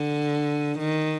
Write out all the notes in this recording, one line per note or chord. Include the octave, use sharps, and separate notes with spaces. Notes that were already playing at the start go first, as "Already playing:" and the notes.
Already playing: D3
D#3